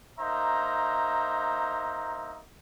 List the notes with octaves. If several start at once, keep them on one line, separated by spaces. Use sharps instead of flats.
A#3 D#4 C5 E5 A#5